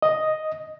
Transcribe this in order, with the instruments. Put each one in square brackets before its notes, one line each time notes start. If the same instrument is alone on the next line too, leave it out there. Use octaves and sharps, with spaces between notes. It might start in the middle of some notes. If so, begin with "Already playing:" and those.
[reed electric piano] D#5